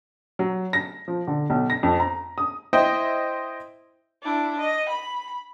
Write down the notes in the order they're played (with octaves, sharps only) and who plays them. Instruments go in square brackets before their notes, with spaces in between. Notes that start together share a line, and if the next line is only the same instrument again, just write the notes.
[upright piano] F#3
A#6
F3
D3
B1
A#6
F2
A#5
D#6
[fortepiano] E4 C5 D#5 E5 G5
[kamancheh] D4 E4
D#5
B5